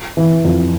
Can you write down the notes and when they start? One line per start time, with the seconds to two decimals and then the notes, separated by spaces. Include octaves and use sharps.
0.17 E3
0.45 F2